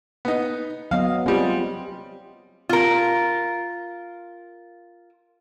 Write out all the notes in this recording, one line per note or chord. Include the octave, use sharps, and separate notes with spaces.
B3 D#4
F#3 B3 D#5 F5
G3 G#3 C4 F4
F4 A#4